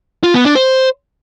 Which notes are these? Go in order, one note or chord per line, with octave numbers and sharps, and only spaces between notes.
F4
B3
D4
C5